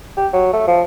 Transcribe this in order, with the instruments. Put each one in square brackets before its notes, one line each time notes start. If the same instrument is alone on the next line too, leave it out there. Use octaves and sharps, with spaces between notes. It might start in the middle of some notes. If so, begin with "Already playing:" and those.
[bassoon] G4
F#3
A3
F3